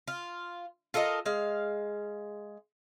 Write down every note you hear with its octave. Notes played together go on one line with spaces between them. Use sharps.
F4
F4 A4 A#4 D#5
G#3 F5